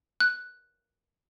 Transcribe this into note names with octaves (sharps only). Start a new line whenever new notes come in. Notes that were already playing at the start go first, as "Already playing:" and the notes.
F#6